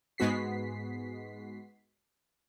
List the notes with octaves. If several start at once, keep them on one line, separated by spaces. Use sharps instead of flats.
G#2 G#3 B3 F#4 B6 C7